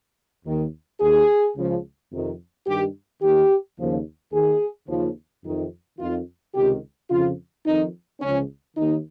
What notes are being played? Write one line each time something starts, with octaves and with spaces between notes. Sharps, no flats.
D#2 D#3
D#2 D#3 G#4
C#2 C#3 F3
F2 C3 D#3
G2 D#3 G4
D#2 D#3 G4
D#2 C#3 F3
D#2 D#3 G#4
D#2 C#3 F3
F2 C3 D#3
F2 D#3 F4
C#2 C3 D#3 G4
F2 C#3 F3 F4
F2 D#3 D#4
C#2 C#3 F3 C#4
D#2 D#3 D#4